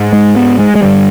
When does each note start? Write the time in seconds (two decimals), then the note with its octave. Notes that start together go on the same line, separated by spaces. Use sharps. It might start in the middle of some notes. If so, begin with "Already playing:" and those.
Already playing: G#2
0.13 G#3
0.36 B3
0.59 G#3
0.75 G#3
0.82 G2 D3 G3